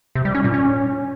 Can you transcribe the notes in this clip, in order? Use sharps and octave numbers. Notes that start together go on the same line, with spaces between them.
C3
G3
C#4
A#2
C#4